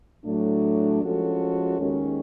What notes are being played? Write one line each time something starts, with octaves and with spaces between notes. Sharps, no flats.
A2 F#3 A3 D4
F3 G#3 C#4 F#4 A4
D#2 D#3 G#3 C#4